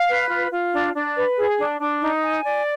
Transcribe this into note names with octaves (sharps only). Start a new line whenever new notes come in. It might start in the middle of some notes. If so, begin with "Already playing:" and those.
Already playing: F5
B4
F4
F4
D4
D4
B4
G#4
D4
D4
D#4
G#5
D5